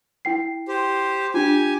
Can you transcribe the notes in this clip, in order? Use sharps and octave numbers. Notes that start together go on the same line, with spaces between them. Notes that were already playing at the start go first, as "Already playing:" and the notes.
E4 G5 C7
G4 C5
D4 F4 G4 G#5